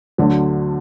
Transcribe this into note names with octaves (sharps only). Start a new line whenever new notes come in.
D2 D3 F#3